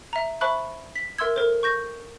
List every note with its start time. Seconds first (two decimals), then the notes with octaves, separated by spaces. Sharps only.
0.13 E5 A#5
0.41 C5 E5 A5 B5 C#6 F#6
0.96 B6
1.18 A#4 E5 C6 E6 G#6
1.36 A4 A#4 C5
1.63 C#6 G6 A#6